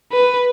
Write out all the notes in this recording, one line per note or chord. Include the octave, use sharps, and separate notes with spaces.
B4